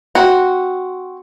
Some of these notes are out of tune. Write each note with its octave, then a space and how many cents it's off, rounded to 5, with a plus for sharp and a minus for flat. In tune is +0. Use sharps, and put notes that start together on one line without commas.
C4 +0 F#4 +0